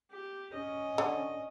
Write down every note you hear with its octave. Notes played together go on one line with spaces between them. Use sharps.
G4
C#4 D#5
D3